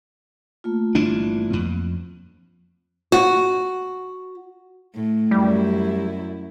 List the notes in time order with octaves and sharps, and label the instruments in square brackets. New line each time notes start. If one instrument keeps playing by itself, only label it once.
[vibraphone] A3 A#3 F4
[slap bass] G1 E3 D4
F2
[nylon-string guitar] F#4
[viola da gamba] A2
[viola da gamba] F#2 E4 [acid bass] G3